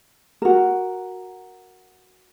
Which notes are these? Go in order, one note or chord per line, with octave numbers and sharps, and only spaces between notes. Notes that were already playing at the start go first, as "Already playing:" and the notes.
F#4 A#4